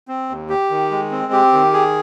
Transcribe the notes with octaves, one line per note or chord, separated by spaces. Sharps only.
C4
D#2
G4
D#3
G#3
C4
G4
D#3
G#4